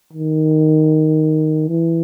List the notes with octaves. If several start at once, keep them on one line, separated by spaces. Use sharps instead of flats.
D#3
E3